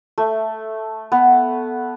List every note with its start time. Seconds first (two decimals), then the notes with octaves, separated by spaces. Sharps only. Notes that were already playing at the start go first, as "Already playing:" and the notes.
0.18 A3
1.12 B3